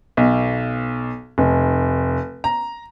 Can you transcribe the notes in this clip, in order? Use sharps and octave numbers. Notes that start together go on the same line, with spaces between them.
B1
F1
A#5